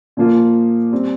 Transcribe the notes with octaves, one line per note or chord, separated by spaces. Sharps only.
A#2 F3 A#3 F4
G3 C4